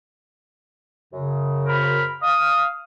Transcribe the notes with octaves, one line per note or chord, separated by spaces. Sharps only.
F#2 C#3
A#4 C5 B5
F5 D#6